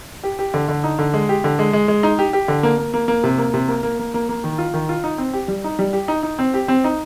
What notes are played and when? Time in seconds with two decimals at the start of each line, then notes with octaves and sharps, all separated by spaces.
0.24 G4
0.39 G4
0.54 D3
0.69 D3
0.84 D#4
0.99 D3
1.14 G#3
1.29 G4
1.44 D3
1.59 G#3
1.73 G#3
1.88 G#3
2.03 D#4
2.19 G4
2.33 G4
2.48 D3
2.63 A#3
2.78 A#3
2.94 A#3
3.08 A#3
3.24 C3
3.38 A#3
3.54 C3
3.68 A#3
3.83 A#3
3.99 A#3
4.14 A#3
4.29 A#3
4.44 D#3
4.58 F4
4.74 D#3
4.89 F4
5.04 D#4
5.18 C4
5.33 G4
5.48 G3
5.64 D#4
5.79 G3
5.93 G4
6.08 D#4
6.23 D#4
6.39 C4
6.54 G4
6.68 C4
6.84 D#4